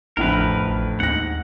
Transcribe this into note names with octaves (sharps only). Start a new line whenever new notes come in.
A1 F2 A2 D3 A#4 B4
A1
D#2 G#2 F#5 A#6